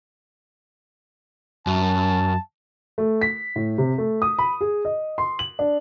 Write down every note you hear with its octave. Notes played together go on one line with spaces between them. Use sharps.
F#2 A5
A3
B6
A2
C3
A3
D#6
B5
G#4
D#5
C6
F#7
D4